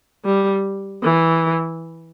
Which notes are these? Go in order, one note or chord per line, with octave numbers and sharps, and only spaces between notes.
G3
E3